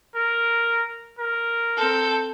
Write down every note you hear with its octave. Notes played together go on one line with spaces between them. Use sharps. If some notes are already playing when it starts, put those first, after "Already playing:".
A#4
A#4
C4 A4 G6